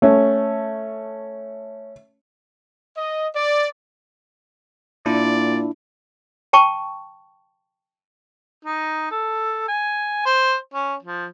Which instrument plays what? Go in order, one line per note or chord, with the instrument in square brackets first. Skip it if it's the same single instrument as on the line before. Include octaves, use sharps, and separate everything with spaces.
[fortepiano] A3 C#4
[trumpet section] D#5
D5
[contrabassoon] A#2 [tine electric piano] D4 E4 [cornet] D5
[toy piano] G5 A5 C#6
[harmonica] D#4
A4
G#5
C5
C#4
F3